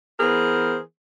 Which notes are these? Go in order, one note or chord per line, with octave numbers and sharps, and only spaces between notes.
E3 B3 G#4 A#4 C5